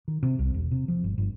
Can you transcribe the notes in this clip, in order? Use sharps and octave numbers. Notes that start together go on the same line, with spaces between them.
D#3
C3
C2
E1
C3
F3
G1
G1